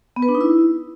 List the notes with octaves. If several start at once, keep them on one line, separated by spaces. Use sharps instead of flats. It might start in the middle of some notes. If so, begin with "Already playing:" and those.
B3
B4
D4
D#4
E4